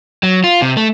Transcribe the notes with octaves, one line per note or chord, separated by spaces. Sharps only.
F#3
F4
C3
A3